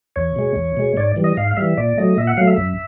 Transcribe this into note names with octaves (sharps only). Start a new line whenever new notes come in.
E2 C#5
B2 G#3
E2
B2 G#3
G#2 D5
E3 G3
D#5
G#2 F5
F5
E3 G3 E5
A#2 D5
F#3 A3 D#5
A#2 E5
F#5
F#3 A3 F5
E5
F#2